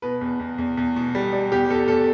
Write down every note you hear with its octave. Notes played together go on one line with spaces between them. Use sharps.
B2 B4
E2
E2
E2
E2
B2
G3
G3
E2 G4
E2 A4
E2 A4